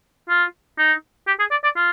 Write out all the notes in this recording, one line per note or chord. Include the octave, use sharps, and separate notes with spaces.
F4
D#4
G4
G#4
D5
D5
F4